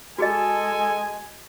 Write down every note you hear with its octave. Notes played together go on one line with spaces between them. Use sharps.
G#3 F#4 G#4 A4 D#5 G#5